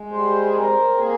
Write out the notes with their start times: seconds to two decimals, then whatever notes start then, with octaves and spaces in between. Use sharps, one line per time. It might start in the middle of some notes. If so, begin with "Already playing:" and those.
Already playing: G#3
0.11 G3 C5
0.44 G#4
0.54 C4 A#4
0.98 A#3 G#4